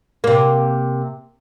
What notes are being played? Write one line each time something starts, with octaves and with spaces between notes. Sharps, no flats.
C3 A#3